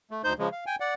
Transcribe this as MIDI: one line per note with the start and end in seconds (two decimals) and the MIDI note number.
0.11 0.22 57
0.24 0.33 38
0.24 0.33 63
0.24 0.33 72
0.24 0.33 91
0.39 0.49 49
0.39 0.49 53
0.39 0.49 56
0.52 0.64 77
0.66 0.76 79
0.66 0.76 80
0.80 0.94 74
0.80 0.94 78